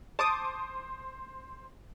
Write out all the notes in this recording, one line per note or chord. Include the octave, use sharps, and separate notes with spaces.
C5 A5 D6 D#6